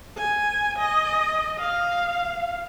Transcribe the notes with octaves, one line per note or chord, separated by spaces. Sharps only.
G#5
D#5
F5